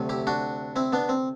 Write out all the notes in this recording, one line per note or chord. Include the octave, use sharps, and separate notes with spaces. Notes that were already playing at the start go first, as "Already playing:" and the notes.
Already playing: D2 C3 F#3 A3
E4 G4
D4 F#4
C4 E4
B3 D4
C4